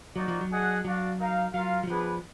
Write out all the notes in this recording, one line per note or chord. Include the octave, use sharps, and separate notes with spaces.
F#3 A#3 D#4 F#4 D5
F3
F#3
D4 G#4 D#5 F#5
F#3 D4 F#4 D5 F5
D#4 A#4 F5
F#3 F4 A#4 F5
F#3
F3 B3 D4 G#4 B4